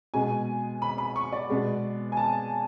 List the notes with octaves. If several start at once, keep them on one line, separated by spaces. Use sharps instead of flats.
B2 G#3 B3 G#5
B5
B5
C#6
D5
B2 G#3 B3
G#5
A5